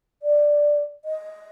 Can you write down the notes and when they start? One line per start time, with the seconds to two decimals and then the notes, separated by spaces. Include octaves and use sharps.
0.22 D5
1.05 D#5